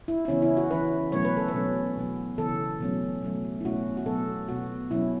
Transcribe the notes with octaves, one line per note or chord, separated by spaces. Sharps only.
E4
E4
C#3 E3 B3 C#4
E4
F#4
E3 C#4 B4
B2 F#3 A3 C#4 C#5
B4
A4
B4
B2 F#3 C#4
B2 F#3 B3
C#3 E3 B3 A4
B2 F#3 A3 C#4
B2 F#3 A3 C#4
E4
B2 A3 C#4 F#4
F#4
B2 F#3 B3 A4
B2 B3 F#4
B2 F#3 C#4 E4